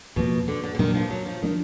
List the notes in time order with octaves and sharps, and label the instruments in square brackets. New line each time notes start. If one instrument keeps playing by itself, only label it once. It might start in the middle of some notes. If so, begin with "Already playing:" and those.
[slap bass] F2 F3 A#3 [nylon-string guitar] B2
[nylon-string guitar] D3
D3
D3
[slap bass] A#2 F#3 D4 [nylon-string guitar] D#3
[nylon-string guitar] F3
F#3
F3
[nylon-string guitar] D#3 [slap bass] F3 A#3 D4